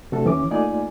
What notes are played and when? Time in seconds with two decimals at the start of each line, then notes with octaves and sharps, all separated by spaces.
0.12 C3 A3 D4 F#4 A4
0.25 D#2 E3 C#4 D6
0.51 A3 A#3 D#4 F4 D5 G#5